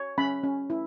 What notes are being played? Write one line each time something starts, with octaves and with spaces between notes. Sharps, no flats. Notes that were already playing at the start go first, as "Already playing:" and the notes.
Already playing: C#5
C#4 B5
C#4
E4